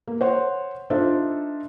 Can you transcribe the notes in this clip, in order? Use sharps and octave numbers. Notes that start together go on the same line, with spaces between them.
A#3
C5 C#5 F#5
D4 D#4 F4 A4 C5 E5